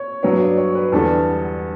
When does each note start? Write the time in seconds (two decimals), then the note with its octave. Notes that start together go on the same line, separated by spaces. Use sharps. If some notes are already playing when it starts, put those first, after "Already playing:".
Already playing: C#5
0.23 G2 F#3 B3 C#5
0.41 D5
0.58 C#5
0.75 B4
0.92 E2 D3 G3 B3 A4